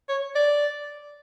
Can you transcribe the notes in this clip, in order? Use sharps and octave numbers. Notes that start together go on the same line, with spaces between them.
C#5
D5